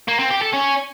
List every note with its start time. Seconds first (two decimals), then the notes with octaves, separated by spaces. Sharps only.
0.08 A#3
0.19 C4
0.30 G4
0.42 A4
0.53 C#4